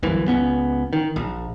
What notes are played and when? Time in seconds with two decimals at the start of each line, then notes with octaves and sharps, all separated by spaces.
0.03 G1 C2 F#2 E3
0.27 C#2 B3 C#4
0.93 D#3
1.16 A#1